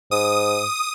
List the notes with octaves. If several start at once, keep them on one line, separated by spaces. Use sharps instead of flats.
G#2 D#6